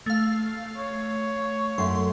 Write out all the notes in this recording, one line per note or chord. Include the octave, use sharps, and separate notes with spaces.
A3 F5
C#5
F#2 A3 C6